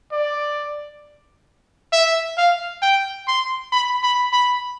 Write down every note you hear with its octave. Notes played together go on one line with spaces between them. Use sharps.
D5
E5
F5
G5
C6
B5
B5
B5